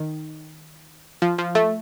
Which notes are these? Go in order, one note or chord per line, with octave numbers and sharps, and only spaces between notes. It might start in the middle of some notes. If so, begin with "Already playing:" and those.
Already playing: D#3
F3
F3
A3